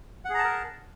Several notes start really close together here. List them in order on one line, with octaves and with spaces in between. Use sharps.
F#5 G#4 A#5 A5 A#4